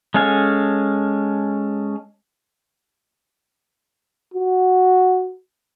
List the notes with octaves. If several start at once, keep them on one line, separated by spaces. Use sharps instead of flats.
G#3 C#4 A4 F5 G#5
F#4